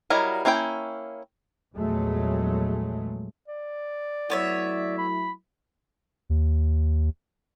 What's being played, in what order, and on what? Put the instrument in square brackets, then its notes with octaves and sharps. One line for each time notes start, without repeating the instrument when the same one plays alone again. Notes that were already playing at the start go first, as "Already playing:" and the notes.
[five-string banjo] F#3 G3 E4 A#4 D#5
A#3 C#4 E4 B4 G5
[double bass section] A#1 E2 F#3 G#3 A3
[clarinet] D5
[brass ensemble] F#3 A3 E4 [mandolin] B3 C#5 E5
[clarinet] B5
[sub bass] D#2